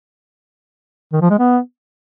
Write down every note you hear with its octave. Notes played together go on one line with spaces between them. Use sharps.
D#3
F3
G#3
B3